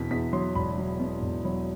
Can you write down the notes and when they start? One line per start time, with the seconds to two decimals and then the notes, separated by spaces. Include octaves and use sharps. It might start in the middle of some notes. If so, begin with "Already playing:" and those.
Already playing: E2 B2 B6
0.11 E2 B6
0.33 F#3 C6
0.55 E1 B5
0.78 F#3
1.00 B2
1.22 E1
1.45 F#3 B5